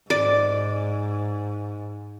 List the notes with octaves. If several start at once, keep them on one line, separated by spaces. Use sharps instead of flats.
G#2 D5